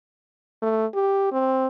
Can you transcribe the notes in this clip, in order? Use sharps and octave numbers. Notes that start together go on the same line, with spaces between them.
A3
G4
C4